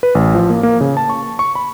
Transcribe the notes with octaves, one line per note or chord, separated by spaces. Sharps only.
B4
A1
F3
A#3
A#3
C#3
A5
C#6
C#6
B5